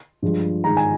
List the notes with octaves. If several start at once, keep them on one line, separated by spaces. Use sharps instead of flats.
G2 F3 G#3
G#2 D#3 G#3 A#5
G#5